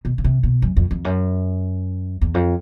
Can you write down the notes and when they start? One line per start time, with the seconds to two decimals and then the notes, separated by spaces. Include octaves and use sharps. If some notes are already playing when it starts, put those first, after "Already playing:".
0.05 B2
0.18 C#3
0.24 C3
0.43 B2
0.62 F#2
0.77 F2
0.91 F2
1.05 F#2
2.21 E2
2.34 F2